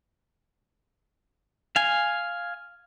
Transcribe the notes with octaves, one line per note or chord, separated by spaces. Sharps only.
F5 G#5